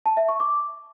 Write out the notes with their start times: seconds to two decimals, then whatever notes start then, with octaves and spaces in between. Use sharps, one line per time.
0.06 A5
0.17 E5
0.29 C#6
0.40 D6